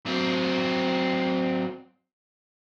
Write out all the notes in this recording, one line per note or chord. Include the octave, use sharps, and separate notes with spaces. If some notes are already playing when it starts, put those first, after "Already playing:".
F#3 C4